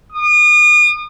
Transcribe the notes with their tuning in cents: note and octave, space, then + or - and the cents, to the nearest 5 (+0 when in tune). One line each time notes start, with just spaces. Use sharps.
D#6 -40